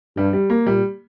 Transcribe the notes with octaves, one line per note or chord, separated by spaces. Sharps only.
G2 G3
G3
A#3
A#2 G3